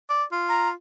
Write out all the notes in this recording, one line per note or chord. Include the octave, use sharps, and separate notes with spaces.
D5
F4
A#5